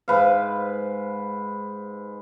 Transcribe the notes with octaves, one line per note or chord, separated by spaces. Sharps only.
G#2 B4 F5